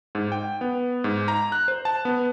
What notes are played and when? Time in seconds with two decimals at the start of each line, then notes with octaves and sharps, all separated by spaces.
0.15 G#2
0.32 G5
0.61 B3
1.04 G#2
1.28 A#5
1.52 F#6
1.68 C5
1.85 A5
2.05 B3